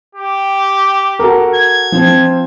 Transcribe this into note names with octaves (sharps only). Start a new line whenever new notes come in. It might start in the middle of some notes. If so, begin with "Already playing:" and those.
G4
F#4 A4 A#4
G#6
F3 C4